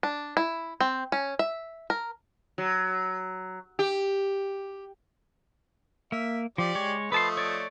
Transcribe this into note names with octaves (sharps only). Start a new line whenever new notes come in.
D4
E4
C4
C#4
E5
A#4
F#3
G4
A#3 E5
F3 G4 D5
G#3 C#5
F3 A3 B4 D#5 A5 C6
C#5 D5